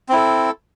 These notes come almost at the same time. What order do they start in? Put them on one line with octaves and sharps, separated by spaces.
C4 E4 A4